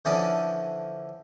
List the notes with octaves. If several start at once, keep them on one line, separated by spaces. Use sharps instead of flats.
D3 E3 F3 C#4 D5 D#6